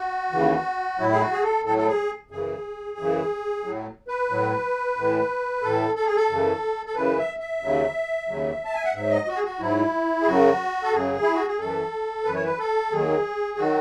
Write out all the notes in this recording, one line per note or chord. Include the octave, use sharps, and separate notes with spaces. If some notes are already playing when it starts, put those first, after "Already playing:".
Already playing: F#4
D#2 C#3 E3
A2 F#3 E4
G#4
F#4
G#4
A4
A2 F#3 A4
A4
G#4
F#2 C#3 E3 G#4
F#2 C#3 E3
A2 F#3
B4
A2 F#3
A2 E3
A2 E3 A4
A4
G#4
A4
F#2 C#3 E3
A4
F#2 C#3 E3 B4
E5
E5
D#2 C#3 F#3
D#2 C#3 F#3
A5
G#5
F#5
G#2 F#3 E5
D#5
F#4
G#4
F#4
G#2 F#3 E4
G#4
F#2 C#3 F#3 F#4
A4
F#2 C#3 F#3 G#4
E4
F#4
G#4
F#2 E3 A4
F#2 E3 B4
C#5
B4
A4
D#2 D#3 F#3 G#4
D#3 F#3 F#4